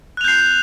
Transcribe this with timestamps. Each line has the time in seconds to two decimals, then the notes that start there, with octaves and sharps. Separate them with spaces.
0.17 F#6
0.21 F7
0.24 G6
0.28 C7